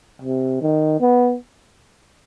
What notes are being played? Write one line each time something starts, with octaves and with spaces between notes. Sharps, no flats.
C3
D#3
B3